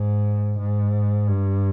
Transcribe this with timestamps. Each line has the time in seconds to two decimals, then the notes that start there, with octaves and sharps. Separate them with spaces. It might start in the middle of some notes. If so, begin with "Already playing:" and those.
Already playing: G#2
0.59 G#2
1.28 G2